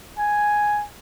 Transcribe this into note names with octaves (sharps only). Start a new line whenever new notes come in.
G#5